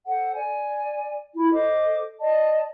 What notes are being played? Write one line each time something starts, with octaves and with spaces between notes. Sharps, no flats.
A4 C5 F#5
D5 G#5
E4 F4 B5
A4 C5 D#5 D6
D5 D#5 A5